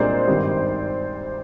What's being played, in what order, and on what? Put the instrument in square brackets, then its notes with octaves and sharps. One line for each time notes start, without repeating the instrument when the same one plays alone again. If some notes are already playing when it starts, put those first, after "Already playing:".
Already playing: [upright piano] C2 A#2 G#3 D4 G#4 [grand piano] C5 D5
[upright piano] G#1 G2 D#3 G3